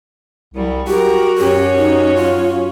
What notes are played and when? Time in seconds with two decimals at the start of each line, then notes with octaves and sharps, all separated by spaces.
0.54 C2 F#3 G3
0.88 F#4 G4 A#4
1.38 F#2 C#4 G4 C#5
1.76 D#4
2.15 F4